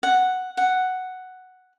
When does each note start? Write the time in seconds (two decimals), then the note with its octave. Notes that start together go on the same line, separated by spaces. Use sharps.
0.03 F#5
0.57 F#5